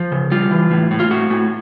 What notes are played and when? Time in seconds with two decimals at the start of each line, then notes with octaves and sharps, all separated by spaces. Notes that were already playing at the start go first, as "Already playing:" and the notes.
Already playing: F3
0.12 C#3
0.31 G3 F4
0.51 E3
0.71 A2
0.91 A2
1.00 F4
1.11 A2 F#4
1.30 A2